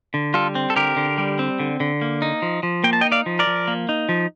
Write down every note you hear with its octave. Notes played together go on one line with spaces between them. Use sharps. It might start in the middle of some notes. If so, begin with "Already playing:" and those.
D3
G3 F4 A4
C4
A4
D3 G4 A#4
D3
G3
C4
D3
D3
A#3
D#4
F3
F3
A#3 G5
A5
D#5 G5
D#4
D5 F5
F3
A#4 D5
F3
A#3
D#4
F3